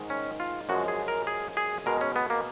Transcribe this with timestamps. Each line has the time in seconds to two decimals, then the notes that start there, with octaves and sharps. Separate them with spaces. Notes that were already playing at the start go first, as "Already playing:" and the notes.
Already playing: G#2 D#3 G#3
0.10 C#4
0.40 F4
0.69 F#2 F3 G#3 F#4
0.88 G#4
1.08 A#4
1.27 G#4
1.57 G#4
1.86 B2 G#3 A#4
2.01 C#4
2.16 B3
2.30 A#3